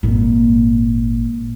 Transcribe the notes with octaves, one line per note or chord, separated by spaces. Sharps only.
G#1 A#2